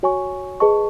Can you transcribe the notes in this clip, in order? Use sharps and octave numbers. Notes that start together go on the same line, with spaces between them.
F#4 C#5 G#5 C#6
G#4 B4 D#5 A5 C#6